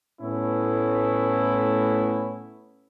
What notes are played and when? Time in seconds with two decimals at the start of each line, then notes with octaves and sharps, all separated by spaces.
0.22 A2 A3 B3 C#4 E4